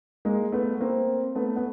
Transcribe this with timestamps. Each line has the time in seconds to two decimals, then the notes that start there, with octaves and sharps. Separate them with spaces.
0.25 G#3 A#3
0.52 A3 B3
0.80 A#3 C4
1.35 A3 B3
1.56 B3